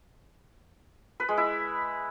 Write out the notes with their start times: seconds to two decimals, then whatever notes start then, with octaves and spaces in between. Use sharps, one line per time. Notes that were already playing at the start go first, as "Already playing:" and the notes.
1.20 B4
1.29 G#3
1.37 E4